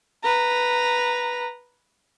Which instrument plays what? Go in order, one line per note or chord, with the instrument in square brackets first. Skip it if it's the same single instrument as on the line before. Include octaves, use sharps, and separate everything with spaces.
[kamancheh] B4 A#5